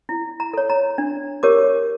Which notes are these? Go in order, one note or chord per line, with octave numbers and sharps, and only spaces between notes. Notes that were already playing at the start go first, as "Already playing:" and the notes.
E4
A#5
A4 C#5
A#5
D4
G4 A#4 C#5 D6